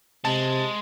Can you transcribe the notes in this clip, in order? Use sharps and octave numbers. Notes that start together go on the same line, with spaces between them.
C3 G#3 A5